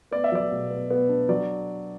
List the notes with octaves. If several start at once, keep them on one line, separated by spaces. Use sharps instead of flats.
B3 D5
E5
F#3 D5
B2
B3
B3
D4
F#3 D5